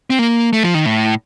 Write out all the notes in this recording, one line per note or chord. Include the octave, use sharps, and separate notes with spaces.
C4
A#3
A3
F3
D#3
A2